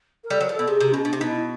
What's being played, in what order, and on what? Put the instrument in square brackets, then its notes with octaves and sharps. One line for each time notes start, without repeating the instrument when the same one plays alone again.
[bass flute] A#4
[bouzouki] G3 [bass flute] A4
[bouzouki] F#3 [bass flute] A#4
[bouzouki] F3
[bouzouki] B2 [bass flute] A4
[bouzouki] C3 [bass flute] G#4
[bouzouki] C3
[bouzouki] B2 [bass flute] C#4
[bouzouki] B2 [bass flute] D4
[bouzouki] C3
[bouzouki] B2 [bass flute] D#4
[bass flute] E4